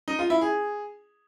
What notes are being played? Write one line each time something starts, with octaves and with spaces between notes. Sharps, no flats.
D#4
F4
E4
G#4